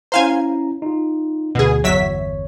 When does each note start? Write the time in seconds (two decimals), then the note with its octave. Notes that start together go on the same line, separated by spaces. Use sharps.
0.12 C#4 E4 C5 F5 G#5 A#5
0.82 D#4 F4
1.55 D2 B2 G#4
1.84 G1 E2 F#3 C#5 E5 B6